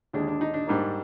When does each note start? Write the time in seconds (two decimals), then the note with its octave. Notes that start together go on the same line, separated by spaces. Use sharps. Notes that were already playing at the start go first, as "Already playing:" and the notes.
0.13 D#2 D3 G#3 D4
0.28 D4
0.41 D#4
0.54 D4
0.67 G#2 G3 A#3 D4